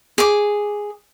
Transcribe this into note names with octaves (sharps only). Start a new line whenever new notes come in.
G#4 D6